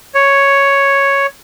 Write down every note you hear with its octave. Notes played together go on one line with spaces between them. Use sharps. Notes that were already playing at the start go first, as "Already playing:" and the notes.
C#5